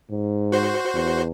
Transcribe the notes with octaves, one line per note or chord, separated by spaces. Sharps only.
G#2
F#4 C5
E2